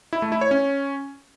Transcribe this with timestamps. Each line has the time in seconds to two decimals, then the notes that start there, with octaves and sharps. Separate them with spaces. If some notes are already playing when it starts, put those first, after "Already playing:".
0.13 E4
0.22 A3
0.32 E4
0.41 C#5
0.51 C#4